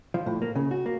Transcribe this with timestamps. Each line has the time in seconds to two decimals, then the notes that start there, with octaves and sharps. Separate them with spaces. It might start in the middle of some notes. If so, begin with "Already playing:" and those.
0.14 F3
0.26 A2
0.42 A#3
0.55 C#3
0.71 F#4
0.86 A#3